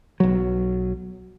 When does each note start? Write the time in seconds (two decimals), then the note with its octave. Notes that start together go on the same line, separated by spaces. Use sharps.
0.20 B1 F#3